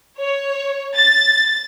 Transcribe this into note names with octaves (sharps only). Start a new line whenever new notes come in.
C#5
A6